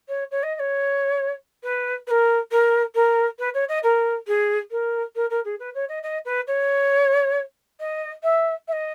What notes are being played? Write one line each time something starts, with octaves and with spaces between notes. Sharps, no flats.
C#5
C#5
D#5
D#5
C#5
B4
B4
A#4
A#4
A#4
B4
C#5
D#5
A#4
G#4
A#4
A#4
A#4
G#4
B4
C#5
D#5
D#5
B4
C#5
D#5
E5
E5
D#5